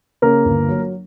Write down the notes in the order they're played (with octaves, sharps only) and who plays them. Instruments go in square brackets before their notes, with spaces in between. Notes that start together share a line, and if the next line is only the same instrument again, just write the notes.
[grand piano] C#3 A#3 A#4
G1
F#3